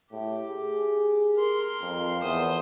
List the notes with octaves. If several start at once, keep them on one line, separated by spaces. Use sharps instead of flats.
A2 G4
G#4
A#4 C6
F2
E2 C5 D#6